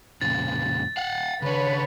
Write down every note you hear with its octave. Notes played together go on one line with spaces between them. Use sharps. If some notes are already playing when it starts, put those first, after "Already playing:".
F2 A#2 C#3 A6
F5 F#5
C#3 D4 B4 C#5